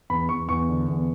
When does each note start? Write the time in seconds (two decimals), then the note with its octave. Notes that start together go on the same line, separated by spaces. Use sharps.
0.10 E2 B5
0.29 E2 C#6
0.48 E2 C#6
0.69 D3
0.88 E2